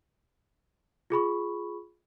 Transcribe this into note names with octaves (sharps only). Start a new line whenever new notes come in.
F4 G#4 B5 C#6